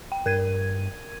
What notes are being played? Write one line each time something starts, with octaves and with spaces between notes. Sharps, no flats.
G5
G2 A#4 G#6 D#7